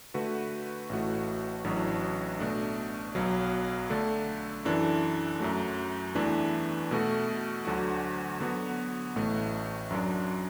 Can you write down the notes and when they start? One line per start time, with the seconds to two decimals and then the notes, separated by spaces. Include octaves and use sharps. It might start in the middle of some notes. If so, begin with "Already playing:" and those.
0.14 D3 A3 F#4 B4
0.89 A1 A2 A3 F#4
1.64 A1 A2 F#3 D4
2.39 B2 A3 D4
3.15 B1 B2 F#3
3.90 D3 A3 D4 A4
4.65 F#2 E3 D4 A4
5.40 F#2 F#3 A3
6.15 E2 E3 A3 D4 B4
6.91 B2 A3 F#4 A4
7.65 D2 D3 F#3 D4 F#4
8.40 D3 F#3 B3 F#4
9.16 A1 A2 A3
9.91 F#2 F#3 D4